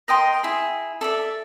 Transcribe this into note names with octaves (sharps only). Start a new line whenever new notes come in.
A#4 D#5 G5 C6
E4 G#4
A4 D5 E5